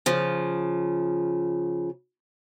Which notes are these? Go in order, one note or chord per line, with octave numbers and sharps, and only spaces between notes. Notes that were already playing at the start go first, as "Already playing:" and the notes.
C#3 F3